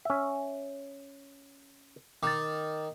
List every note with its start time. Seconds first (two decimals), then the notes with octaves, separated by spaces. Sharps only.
0.05 C#4 E5
2.23 D#3 D6 A6